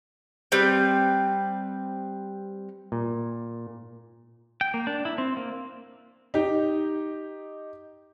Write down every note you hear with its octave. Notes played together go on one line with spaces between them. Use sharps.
G3 C4 B4
A#2
G5
A#3
D4
E4
C4
A#3
D#4 G4